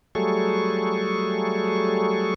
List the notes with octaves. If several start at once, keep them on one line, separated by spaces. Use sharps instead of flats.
F#3 G3 A3 G#4 A4 C#6